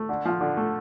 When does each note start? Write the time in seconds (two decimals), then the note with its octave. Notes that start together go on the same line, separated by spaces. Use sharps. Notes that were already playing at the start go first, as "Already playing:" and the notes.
Already playing: A3
0.09 D3
0.25 F3
0.41 D3
0.57 A3